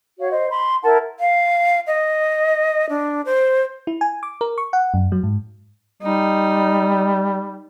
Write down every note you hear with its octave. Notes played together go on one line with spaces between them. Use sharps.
F#4 C#5 F5
C5 D#5
B5 C6
E4 A#4 F#5 A5
F5
D#5
D4
C5
E4
G#5
D6
A#4
C#6
F#5
F#2
F#3
G#2
G3 D#4